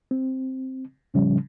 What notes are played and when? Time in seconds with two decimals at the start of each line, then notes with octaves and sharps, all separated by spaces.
0.11 C4
1.14 A2 C#3 F3 G3 C#4